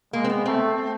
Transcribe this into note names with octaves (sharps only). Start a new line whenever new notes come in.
G#3 A#3
C4
B3
A3 C4